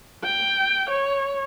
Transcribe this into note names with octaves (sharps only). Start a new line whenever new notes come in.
G5
C#5